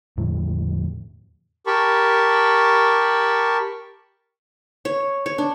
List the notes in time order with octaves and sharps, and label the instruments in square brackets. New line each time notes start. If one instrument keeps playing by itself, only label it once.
[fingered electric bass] E2 A2 D3 F3
[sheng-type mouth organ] G4 A#4 A5 B5 C#6
[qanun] C#5
C#5
D4